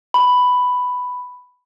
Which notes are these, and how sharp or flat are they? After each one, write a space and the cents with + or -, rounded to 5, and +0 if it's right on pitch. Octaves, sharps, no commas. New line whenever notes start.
B5 +5